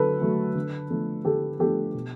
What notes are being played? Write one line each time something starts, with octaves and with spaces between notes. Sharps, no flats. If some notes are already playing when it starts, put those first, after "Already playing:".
Already playing: D3 F#3 A3 A4 B4
F#3 A3
D3
F3 A3 D4
D3 G4 A4
F3 A3 D4 G4 A4
B2